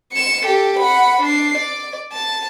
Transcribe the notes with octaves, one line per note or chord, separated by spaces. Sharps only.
C#7 E7
G4 A4
F#5 B5
D4 C7
D5
A5